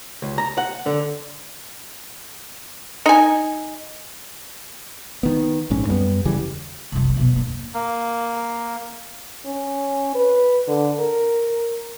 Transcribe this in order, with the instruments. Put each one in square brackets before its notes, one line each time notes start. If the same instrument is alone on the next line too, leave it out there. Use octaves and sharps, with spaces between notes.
[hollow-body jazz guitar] C#2
A#5
F#5
D3
[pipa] D#4 G#5
[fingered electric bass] D#3 B3
A#1 G#2 C#4
F#2 G3 A#3 B3
E2 C#3 E3 G3
[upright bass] C2 F2
G2 C#3
E2 B2
G2 A#3
[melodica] A#3
[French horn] C#4
B4
D3
A#4